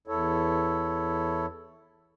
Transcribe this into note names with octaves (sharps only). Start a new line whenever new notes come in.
E2 E4 A4 C#5